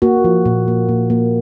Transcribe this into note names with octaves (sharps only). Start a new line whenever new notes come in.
A#3 F#4
F3
A#2
A#3
A#2
A#3